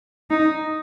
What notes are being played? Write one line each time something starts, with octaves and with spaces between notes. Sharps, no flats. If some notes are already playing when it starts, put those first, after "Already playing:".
D#4